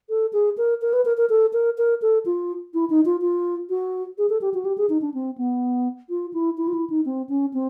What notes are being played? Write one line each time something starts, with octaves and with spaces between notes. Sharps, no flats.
A4
G#4
A#4
A#4
B4
A#4
A#4
A4
A#4
A#4
A4
F4
E4
D#4
F4
F4
F#4
G#4
A4
G4
F#4
G4
G#4
D#4
D4
C4
B3
F4
E4
E4
F4
E4
D#4
C4
C#4
C4